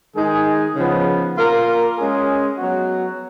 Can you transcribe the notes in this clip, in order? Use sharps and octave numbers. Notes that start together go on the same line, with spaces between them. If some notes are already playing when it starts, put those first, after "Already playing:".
D#3 G#3 D#4 G#4
C#3 F3 B3
A#3 F4 A#4
G#3 C#4 G#4
F#3 B3 F#4